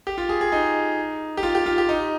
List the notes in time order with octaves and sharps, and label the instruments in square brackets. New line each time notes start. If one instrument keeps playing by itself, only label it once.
[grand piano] G4
F4
G#4
G#4
D#4
G4
F4
G4
F4
G4
D#4